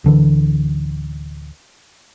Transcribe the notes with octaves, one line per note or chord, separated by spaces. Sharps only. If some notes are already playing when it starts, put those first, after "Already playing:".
D1 D3 E3